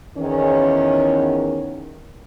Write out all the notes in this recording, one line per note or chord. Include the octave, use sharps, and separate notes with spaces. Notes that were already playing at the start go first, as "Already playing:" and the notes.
E2 D#3 C#4